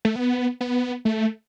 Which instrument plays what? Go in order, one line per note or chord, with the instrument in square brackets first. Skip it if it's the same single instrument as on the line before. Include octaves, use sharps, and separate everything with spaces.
[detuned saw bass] A3
B3
B3
A3